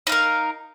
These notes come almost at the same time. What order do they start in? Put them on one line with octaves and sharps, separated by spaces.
D#4 F5 A#4